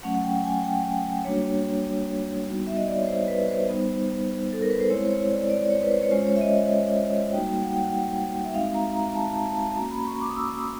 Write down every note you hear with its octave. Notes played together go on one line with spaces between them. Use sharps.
F#3 A3 C#4 F#5
F#5
G5
G#5
G5
G3 A#3 D4 F#4 C#5
G3 B3 D#4 F#4
E5
D#5
D5
C#5
C5
B4
C5
G3 B3 D#4
A4
A#4
B4
C5
G#3 C4 E4 C#5
C5
C#5
D5
D5
D5
C#5
B4
C5
C#5
G#3 C#4 F4 C5
C#5
E5
D#5
D#5
G3 A#3 D#4 F#4 G5
F#5
G5
F#5
E5
G#3 C4 D#4 F#4 F5
A#5
A#5
A5
A5
A5
A5
A#3 C#4 F#4 A#5
B5
C#6
D6
D#6
E6